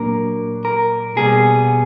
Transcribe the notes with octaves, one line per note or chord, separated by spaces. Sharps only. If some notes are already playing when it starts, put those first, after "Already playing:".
Already playing: A#2 F#3 A#3 D4 A#4
A#4
B2 G3 B3 G#4